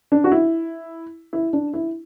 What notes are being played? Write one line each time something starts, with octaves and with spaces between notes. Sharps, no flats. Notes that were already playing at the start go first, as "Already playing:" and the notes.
D4
F#4
E4
E4
D4
E4